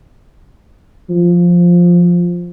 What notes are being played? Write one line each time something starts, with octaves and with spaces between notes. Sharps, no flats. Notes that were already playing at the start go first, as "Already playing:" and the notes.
F3